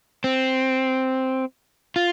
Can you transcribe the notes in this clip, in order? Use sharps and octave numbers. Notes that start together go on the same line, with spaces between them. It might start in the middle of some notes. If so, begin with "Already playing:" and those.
C4
F4